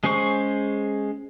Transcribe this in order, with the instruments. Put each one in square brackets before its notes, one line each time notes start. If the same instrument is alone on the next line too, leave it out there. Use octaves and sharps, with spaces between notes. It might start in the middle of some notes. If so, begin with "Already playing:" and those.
[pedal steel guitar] G#3 C#4 G#4 C5 C#6